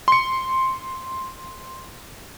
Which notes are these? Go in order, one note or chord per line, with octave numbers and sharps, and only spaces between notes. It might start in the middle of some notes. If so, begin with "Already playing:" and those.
C6 C#7